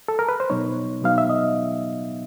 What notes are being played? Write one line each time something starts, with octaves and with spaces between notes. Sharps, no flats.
A4
A#4
B4
C5
B2 F#3 B3 D#4 C#5
B2 F#3 B3 D#4 F5
E5
D#5